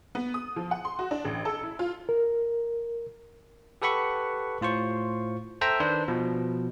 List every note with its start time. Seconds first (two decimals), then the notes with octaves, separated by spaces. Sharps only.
0.15 B3
0.34 D#6
0.56 F3
0.71 F#5
0.85 C6
0.99 F#4
1.11 D4
1.25 A1
1.45 A4
1.63 E4
1.79 F4
2.09 A#4
3.82 G4 A4 B4 F#5 B5 C#6
4.61 A2 F4 C5 C#6
5.61 A4 C5 E5 G5 A#5
5.80 D#3 D4 B4 C5
6.08 B2 F3